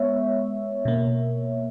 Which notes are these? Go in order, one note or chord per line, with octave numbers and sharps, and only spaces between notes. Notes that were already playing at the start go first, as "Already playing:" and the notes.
Already playing: G#3 B3 C#5 E5
B2 A#3